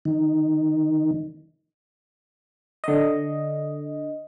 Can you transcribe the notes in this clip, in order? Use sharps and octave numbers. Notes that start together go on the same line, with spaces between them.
D#3
D3 D#5